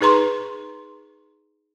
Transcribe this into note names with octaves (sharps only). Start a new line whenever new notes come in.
D#4 G#4 B4 A#5 C6 C#6